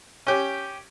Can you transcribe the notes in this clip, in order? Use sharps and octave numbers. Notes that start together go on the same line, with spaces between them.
C#4 G4